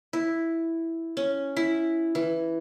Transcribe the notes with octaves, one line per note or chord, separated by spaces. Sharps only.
E4
C#4
E4
E3